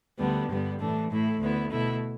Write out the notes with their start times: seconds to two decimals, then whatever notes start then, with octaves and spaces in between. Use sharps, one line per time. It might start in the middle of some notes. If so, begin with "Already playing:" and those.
0.18 D2 D3 G3 B3 D4
0.48 G2 D3 G3 B3
0.79 A2 E3 A3 D4
1.09 A2 A3 E4
1.40 D2 D3 B3 E4
1.71 B2 A3 E4